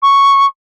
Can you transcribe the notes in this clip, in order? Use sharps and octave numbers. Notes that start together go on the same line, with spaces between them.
C#6